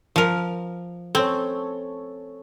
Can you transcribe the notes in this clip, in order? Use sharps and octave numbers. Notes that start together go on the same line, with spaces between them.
F3 A#4
C4 A4 C#5